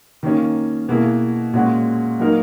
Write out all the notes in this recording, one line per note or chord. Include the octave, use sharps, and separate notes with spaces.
D#3 A#3 C#4
B2 A#3 E4 G#4
A#2 G#3 C#4 F#4
F#3 A#3 D#4 A#4